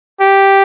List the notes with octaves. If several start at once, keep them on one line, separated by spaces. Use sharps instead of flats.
G4